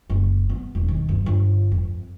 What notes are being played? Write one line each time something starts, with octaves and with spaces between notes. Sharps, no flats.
F#1
B3
E1
D#2
G2
G1
F2